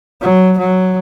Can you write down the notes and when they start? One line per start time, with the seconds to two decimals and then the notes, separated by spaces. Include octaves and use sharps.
0.22 F#3
0.58 F#3